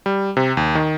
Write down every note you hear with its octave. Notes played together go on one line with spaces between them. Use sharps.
G3
C3
D#2
D#3